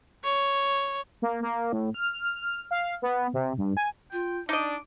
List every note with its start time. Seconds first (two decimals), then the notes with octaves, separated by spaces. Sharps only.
0.24 C#5
1.22 A#3
1.43 A#3
1.73 A2
1.94 F6
2.71 F5
3.02 B3
3.34 C3
3.58 G2
3.77 G#5
4.12 F4 G5
4.49 D4 D#4 D5 D#5 D6